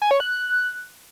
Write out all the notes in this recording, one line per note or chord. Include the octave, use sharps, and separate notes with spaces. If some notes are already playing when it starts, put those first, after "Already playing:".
G#5
C#5
F#6